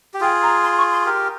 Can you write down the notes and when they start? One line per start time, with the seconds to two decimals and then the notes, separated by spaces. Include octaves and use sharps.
0.14 G4
0.21 F4 G#4 G5
0.43 A#5
0.63 C6
0.78 C#6
0.92 C6
1.06 G4 A#4